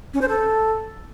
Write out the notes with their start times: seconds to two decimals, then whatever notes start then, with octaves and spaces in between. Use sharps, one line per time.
0.14 C#4
0.21 C5
0.29 A4